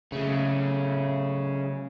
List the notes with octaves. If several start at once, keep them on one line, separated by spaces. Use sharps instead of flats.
C#3 F#3 A3